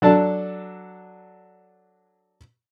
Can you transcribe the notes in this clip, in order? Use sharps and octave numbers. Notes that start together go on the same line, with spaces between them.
F#3 D4 A4 A5